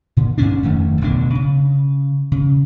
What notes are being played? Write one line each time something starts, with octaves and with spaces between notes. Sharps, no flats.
A#2 D3
G2 D3 C#4 D4
D1 F2 D#3 A3
F#1 D2 B2 D4
C#3
C#3